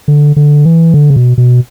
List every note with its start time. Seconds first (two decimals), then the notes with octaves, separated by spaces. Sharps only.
0.08 D3
0.36 D3
0.65 E3
0.94 D3
1.10 C#3
1.16 B2
1.38 B2